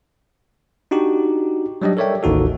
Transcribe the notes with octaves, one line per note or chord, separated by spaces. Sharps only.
D4 D#4 F#4 G4
F#3 G3 D4 G4 D#5
A4 A#4 C#5 D5 E5 G5
A1 D#2 D#4 F#4 A4